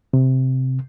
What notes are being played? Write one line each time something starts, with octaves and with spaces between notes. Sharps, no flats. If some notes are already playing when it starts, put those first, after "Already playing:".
C3